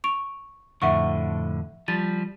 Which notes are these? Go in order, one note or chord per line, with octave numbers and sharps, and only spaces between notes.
C#6 D7 F7
F2 A2 D3 E5 F#5 C#6
F3 G3 A6